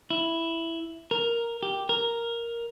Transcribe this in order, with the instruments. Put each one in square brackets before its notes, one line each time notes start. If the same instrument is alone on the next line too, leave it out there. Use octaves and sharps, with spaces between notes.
[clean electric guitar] E4
A#4
G4
A#4